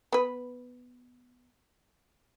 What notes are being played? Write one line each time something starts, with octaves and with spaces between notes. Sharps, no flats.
B3 B4